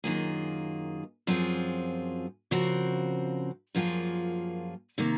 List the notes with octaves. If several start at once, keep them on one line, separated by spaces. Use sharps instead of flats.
F#2 D#3 A#3 F4 G#4
F#2 F3 C4 F4 G#4
C#3 F3 C4 F#4 A#4
F#2 F3 A#3 F4 G#4
C3 D#3 A#3